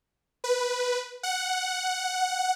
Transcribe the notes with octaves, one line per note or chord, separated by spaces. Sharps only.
B4
F#5